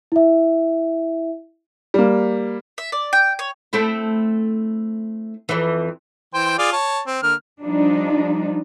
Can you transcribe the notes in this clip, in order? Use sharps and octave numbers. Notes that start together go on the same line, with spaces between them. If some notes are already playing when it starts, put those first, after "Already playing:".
E4 E5
G3 A#3
E5
D5
G5
C#5
A3 C4 E4
F2 E3
E3 C5 G5
F4 G#4 D5
C#5 A5
C4
D3 A#3 F6
F3 G3 D4 D#4